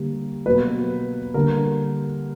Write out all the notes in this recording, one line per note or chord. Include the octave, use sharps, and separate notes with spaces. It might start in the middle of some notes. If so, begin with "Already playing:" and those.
Already playing: D3 G3 A#3
B2 F#3 A#3 B4
D3 G3 A#3 A#4